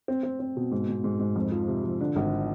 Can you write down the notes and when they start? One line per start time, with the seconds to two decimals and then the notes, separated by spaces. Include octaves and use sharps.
0.08 C4
0.23 C4
0.40 C4
0.57 B2
0.71 G#2
0.89 G#2
1.04 G#2
1.19 G#2
1.36 F2
1.52 F3
1.67 C3
1.84 F3
2.01 D3
2.16 G#1